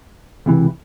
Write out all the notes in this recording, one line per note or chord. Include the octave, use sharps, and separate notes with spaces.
C#2 C3 E3